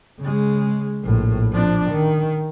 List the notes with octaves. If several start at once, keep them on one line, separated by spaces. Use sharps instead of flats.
C#3 G#3
A#1 A2
F3 D4
D#3